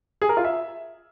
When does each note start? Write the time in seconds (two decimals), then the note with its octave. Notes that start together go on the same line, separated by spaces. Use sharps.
0.22 G#4
0.29 A#4
0.37 F4
0.45 E5